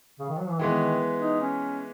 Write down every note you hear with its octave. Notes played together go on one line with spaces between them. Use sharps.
C#3
D#3
F#3
E3
D#3 E3 G#3 B3
D#4
C#4